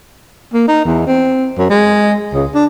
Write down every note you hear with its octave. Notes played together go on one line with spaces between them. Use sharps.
A#3
D#4
E2
C4
F#2
G#3
C#2
D4